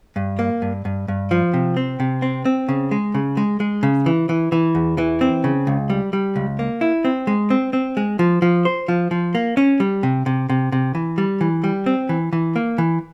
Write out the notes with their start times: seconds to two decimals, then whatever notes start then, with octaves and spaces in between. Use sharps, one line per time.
0.16 G2
0.39 A#3
0.62 G2
0.85 G2
1.08 G2
1.31 F3
1.53 C3
1.77 C4
2.00 C3
2.22 C4
2.45 C4
2.69 C#3
2.91 G#3
3.14 C#3
3.37 G#3
3.60 G#3
3.83 C#3
4.06 E3
4.29 E3
4.52 E3
4.75 E2
4.98 E3
5.21 C4
5.44 C#3
5.67 C#2
5.90 G3
6.13 G3
6.36 C#2
6.59 A#3
6.81 E4
7.05 C4
7.27 G#3
7.50 C4
7.73 C4
7.97 G#3
8.19 F3
8.42 F3
8.65 C5
8.88 F3
9.11 F3
9.35 A#3
9.57 C#4
9.80 G3
10.03 C3
10.26 C3
10.50 C3
10.72 C3
10.95 E3
11.18 G3
11.41 E3
11.64 G3
11.86 C4
12.09 E3
12.33 E3
12.56 A#3
12.78 E3